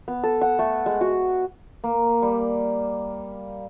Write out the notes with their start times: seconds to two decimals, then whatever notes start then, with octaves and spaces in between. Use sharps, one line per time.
0.08 B3
0.23 A4
0.41 F#5
0.59 A3
0.86 G#3
1.01 F#4
1.84 A#3
2.22 G3